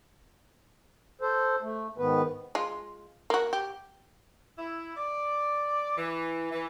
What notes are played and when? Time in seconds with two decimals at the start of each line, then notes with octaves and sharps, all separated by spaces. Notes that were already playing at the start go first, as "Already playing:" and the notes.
1.21 A4 C5
1.62 A3
1.98 G#2 D#3 B3 B4
2.55 G#3 F4
3.30 A#3 F#4
3.53 G4
4.58 E4
4.97 D5
5.97 E3
6.52 E3